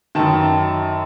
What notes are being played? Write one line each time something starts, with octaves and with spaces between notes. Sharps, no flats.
F#2 D#3 A5